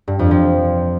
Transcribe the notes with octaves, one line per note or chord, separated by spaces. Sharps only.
G2
F2
F3